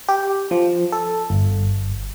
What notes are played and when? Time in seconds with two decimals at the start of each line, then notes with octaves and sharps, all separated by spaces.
0.09 G4
0.51 F3
0.92 A4
1.30 G1